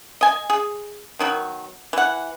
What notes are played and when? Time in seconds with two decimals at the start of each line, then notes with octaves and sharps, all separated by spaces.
0.21 D#5 G#5
0.50 G#4
1.19 B2 D#3 F#3
1.93 E3 F#5